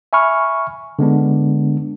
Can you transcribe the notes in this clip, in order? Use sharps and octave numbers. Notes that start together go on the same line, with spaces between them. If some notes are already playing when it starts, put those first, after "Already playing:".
E5 G#5 B5 C#6 F6
D3 G#3 B3 D4